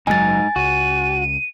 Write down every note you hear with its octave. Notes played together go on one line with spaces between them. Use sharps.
F#1 G#2 B2 F#3 D#4 G#5 A6
C#2 F#4 D#7